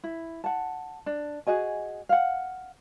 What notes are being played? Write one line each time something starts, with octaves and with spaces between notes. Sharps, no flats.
E4
F#5 A5
D4
F#4 G#4 D#5 G#5
F5 F#5